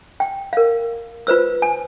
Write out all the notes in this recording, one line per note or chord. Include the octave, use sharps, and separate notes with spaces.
G5
A#4 F5
F4 B4 C5 E6
G#5